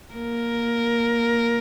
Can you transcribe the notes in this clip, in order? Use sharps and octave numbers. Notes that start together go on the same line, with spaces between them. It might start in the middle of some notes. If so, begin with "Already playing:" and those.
A#3 A#4